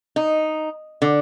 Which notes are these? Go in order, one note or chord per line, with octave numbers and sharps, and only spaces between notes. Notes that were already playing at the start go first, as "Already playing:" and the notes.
D#4
D3